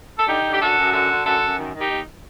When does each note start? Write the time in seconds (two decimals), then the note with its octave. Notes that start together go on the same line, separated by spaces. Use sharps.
0.18 A4
0.27 D3 D#4 G4
0.43 D3
0.53 G4
0.60 F#2 F#4 A4
0.77 F#2
0.92 D3 F#4 A4
1.09 D3
1.25 F#2 F#4 A4
1.42 F#2
1.58 D#3
1.74 D#3
1.79 D#4 G4
1.90 D#2